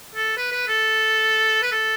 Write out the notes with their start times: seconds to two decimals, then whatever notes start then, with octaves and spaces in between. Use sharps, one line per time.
0.15 A4
0.37 B4
0.52 B4
0.67 A4
1.63 B4
1.72 A4